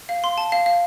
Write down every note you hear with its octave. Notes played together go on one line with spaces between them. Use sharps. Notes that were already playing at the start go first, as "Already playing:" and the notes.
F5
C6
A5
F5
F5